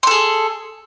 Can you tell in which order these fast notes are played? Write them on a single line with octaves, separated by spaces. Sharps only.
C6 A4 G#4